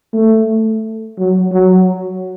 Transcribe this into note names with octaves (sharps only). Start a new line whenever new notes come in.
A3
F#3
F#3